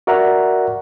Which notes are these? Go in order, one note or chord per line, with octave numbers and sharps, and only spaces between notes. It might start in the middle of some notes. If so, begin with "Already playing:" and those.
F#4 A#4 D5 E5 F#5 A#5